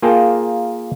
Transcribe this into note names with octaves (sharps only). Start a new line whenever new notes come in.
A#3 F4 G#4 A#4 G5 A5